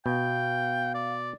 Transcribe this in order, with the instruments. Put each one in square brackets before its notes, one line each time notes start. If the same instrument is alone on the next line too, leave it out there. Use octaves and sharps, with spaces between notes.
[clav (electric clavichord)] B2 [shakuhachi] F5 [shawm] G5
[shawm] D5